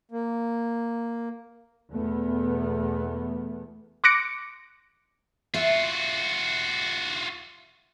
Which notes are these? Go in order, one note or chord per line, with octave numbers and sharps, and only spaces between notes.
A#3
E2 B2 A3 B3
C6 D6 F#6 A#6 C#7 D7
F4 F#4 E5